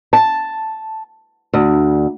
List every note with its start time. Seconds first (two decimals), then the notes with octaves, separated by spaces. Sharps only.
0.13 A5
1.53 D2